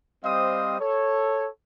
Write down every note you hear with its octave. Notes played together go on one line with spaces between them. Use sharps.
G3 C4 C5 D#5 F5 D#6
A4 C#5